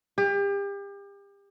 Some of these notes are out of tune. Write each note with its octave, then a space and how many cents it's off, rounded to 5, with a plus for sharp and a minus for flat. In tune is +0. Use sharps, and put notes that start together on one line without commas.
G4 +35